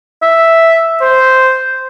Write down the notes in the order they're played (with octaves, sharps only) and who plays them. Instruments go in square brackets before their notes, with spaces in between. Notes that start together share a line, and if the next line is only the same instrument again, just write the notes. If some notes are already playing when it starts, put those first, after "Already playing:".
[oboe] E5
C5